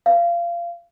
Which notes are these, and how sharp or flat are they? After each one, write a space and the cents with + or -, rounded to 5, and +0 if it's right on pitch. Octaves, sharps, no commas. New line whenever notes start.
F5 -25